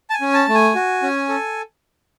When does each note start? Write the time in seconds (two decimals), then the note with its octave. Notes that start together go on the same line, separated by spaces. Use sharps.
0.10 A5
0.14 G#5
0.21 C#4
0.34 A5
0.48 A3
0.55 G#5
0.75 F#4
1.03 C#4
1.29 A4